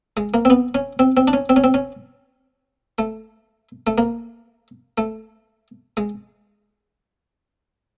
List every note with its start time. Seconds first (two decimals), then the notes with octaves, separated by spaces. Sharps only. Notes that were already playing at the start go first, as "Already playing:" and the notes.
0.17 G#3
0.34 A#3
0.45 C4
0.50 B3
0.75 C#4
0.99 C4
1.17 C4
1.28 D4
1.33 C#4
1.49 C4
1.56 C#4
1.64 C4
1.74 C#4
2.98 A3
3.87 A3
3.98 A#3
4.98 A3
5.97 G#3